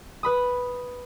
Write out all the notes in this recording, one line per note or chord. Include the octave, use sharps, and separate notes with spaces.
B4 B5 D#6